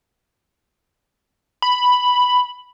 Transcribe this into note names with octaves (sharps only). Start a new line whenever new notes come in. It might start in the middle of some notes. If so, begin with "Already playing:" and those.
B5